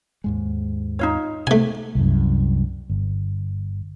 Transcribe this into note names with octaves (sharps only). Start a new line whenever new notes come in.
D#2 G#2 G#3
D#4 F4 C#5
C3 A3 G#5
C2 F#2
G1